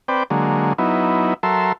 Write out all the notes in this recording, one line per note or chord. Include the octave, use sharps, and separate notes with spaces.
C4 B4 D5 G5
D3 F#3 G#3 A#3
F#3 B3 D#4 E4
F#3 A4 A#4 E5 C6